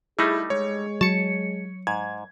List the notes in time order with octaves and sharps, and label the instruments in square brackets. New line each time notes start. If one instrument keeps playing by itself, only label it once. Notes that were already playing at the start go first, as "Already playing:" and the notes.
[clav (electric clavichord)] G3 A3 D#4 [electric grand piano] E4 [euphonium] G#4
[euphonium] G#3 [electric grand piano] C#5
[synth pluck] F#3 C#7 [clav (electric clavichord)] A5
[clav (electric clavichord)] G#2 [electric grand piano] G#6